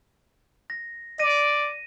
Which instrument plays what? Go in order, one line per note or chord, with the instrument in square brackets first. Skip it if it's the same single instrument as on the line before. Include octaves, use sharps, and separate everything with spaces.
[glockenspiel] A#6
[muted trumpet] D5 [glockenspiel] A#6 D#7